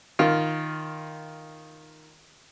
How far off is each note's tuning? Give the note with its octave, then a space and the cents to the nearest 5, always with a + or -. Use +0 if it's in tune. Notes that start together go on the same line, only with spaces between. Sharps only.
D#3 +0 F4 +0